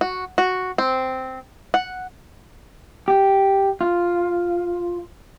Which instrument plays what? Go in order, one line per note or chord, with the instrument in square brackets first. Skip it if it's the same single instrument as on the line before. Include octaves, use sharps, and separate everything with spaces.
[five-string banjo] F#4
F#4
C4
F#5
[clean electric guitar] G4
F4